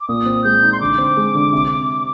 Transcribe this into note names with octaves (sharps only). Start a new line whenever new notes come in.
D6
A#2 D#6
C4
G#3 G6
D#4
C6
D3 D6
C4
G#3
D3
C3